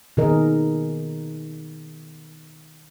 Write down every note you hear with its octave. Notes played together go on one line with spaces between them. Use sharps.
B2 D#3 B3 G#4 A#4 D#5